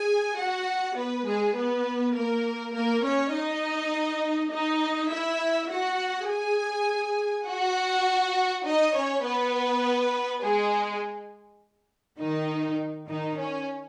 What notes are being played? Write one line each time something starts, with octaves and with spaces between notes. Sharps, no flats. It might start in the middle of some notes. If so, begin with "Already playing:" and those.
Already playing: G#4 G#5
F#4 F#5
B3 B4
G#3 G#4
B3 B4
A#3 A#4
A#3 A#4
C#4 C#5
D#4 D#5
D#4 D#5
E4 E5
F#4 F#5
G#4 G#5
F#4 F#5
D#4 D#5
C#4 C#5
B3 B4
G#3 G#4
D#3 D#4
D#3 D#4
C#4